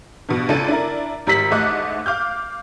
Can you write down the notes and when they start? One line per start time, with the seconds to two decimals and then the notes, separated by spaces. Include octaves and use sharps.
0.29 G2 B2
0.49 C#2 D4 A4 A6 D#7
0.68 D4 E4 A#4
1.27 G#1 G3 A#5 E6 B6 F#7
1.51 D#2 G#2 A3 D#5 D6 F#6
2.06 F5 D6 F6 G6